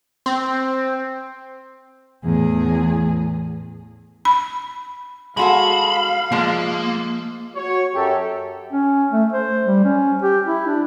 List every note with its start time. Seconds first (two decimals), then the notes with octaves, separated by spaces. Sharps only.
0.26 C4
2.24 E2 A2 G#4
4.25 B5
5.37 G#3 F#4 A4 F5 B5
6.32 F3 G#3 A#3
7.55 F#4 C#5
7.95 F#2 G4 A4
8.73 C#4
9.11 A3
9.33 C5
9.66 G3
9.84 C#4
10.22 G4
10.46 E4
10.67 D4